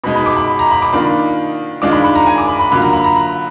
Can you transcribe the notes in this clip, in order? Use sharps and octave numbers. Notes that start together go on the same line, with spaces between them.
B2 G#3 D#4 B5
B5
D6
B5
A#5
B5
D6
D#3 A#3 D4 F4 B5
D#3 G#3 D4 F4 D6
B5
B5
A#5
G#5
D6
B5
B5
D3 F#3 A#3 F4 B5
A#5
B5
A#5
B5